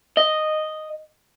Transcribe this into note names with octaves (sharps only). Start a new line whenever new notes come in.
D#5